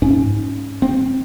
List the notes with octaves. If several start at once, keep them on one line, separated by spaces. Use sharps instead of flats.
G#2 C#4
C4